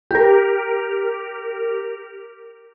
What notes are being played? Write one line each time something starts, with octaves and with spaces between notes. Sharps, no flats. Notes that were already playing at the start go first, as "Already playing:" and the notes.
G4 A#4